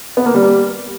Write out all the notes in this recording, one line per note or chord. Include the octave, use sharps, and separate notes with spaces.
B3
A#3
G3